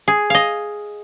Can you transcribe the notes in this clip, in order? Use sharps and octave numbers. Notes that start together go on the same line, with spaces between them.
G#4
D#5 F5